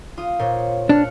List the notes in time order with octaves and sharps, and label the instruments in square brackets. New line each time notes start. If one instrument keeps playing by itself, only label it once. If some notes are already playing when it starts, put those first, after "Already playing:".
[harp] F4 D#6
A#2 C5 C#5
[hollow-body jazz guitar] D4 [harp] F6 F#6 C#7